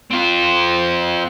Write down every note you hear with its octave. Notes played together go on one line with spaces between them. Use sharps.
C4 F4